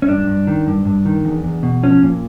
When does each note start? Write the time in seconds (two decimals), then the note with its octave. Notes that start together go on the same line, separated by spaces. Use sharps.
0.02 C#4
0.08 G2 D4
0.27 G2
0.47 D#3
0.67 G2
0.85 G2
1.05 D#3
1.25 E2
1.44 E2
1.63 B2
1.83 F3 C#4
2.02 A#2